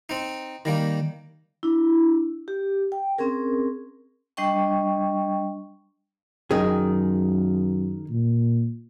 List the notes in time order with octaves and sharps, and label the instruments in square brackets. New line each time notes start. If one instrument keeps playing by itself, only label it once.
[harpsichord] C4 D#4
D#3 G3 A#3
[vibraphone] D4 E4
G4
G5
C4 C#4 G#4 A#4
G3 D4 D#5 G5 C#6
[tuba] F#2 [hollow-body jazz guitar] D#3 G#4
[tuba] A#2